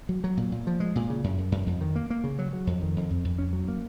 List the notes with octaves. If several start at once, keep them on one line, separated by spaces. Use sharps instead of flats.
F#3
F#3
A#2
A#2
F3
G#3
A#2
C#3
F#2
F#2
F#2
F2
D#3
A#3
A#3
C#3
F#3
F#3
F2
D#3
F2
F2
F2
C#4
F#3
A#3